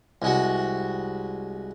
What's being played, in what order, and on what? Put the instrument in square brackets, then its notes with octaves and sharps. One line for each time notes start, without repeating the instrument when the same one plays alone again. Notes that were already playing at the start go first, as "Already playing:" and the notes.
[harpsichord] C2 G#3 F#4